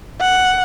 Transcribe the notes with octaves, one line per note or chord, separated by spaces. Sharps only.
F#5